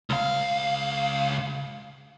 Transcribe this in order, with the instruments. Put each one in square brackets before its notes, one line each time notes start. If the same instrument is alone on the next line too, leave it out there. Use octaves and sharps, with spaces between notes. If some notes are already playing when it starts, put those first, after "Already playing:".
[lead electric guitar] C#2 F5